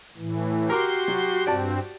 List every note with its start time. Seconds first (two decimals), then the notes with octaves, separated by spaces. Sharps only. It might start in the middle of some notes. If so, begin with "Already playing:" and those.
0.17 A2 E3
0.70 F#4 G4 A#4 C6 D6
1.08 F#3
1.47 G2 C4 D5 A5